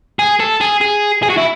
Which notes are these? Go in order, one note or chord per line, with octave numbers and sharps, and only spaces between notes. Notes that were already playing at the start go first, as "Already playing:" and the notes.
G#4
A4
G#4
G#4
G#4
F#4
E4